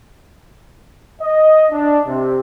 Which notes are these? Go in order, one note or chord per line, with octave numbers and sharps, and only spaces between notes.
D#5
D4
C3